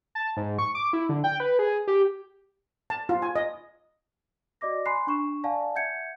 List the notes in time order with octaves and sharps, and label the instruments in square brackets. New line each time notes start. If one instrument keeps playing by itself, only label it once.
[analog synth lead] A5
G#2
C#6
D6
E4
D3
G5
B4
G#4
G4
[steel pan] A5
F4
G#5
D#5
[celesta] F#4 D5 D#5 D6 A#6
G#5 B5 C6 F#6 C7
D4 C#6 E7
D5 F5 F#5 G#5 A5
E5 F#5 G6 G#6 C#7